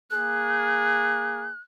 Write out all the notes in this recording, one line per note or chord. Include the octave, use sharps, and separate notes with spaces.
A#3 G#4 F#6